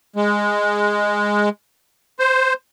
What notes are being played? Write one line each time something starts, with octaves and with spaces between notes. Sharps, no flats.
G#3
C5